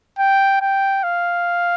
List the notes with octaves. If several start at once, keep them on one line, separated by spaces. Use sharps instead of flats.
G5
G5
F5